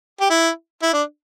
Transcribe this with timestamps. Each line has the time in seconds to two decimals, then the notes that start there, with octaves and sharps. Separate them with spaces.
0.20 G4
0.30 E4
0.83 E4
0.93 D4